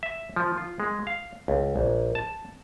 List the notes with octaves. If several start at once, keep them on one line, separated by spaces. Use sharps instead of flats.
E5
F3
F4
G#3
F5
C#2
A#1
A5